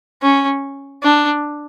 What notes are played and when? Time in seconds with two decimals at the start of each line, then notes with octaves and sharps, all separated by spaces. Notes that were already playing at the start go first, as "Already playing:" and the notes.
0.22 C#4
1.03 D4